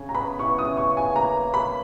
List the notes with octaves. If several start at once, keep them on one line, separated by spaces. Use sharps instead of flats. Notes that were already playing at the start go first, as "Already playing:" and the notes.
Already playing: C#3
A#5
B3 B5
E3 C#6
D#6
C#3
C#6
C#3
G#5
A#3 A#5
A#3
B5
A#4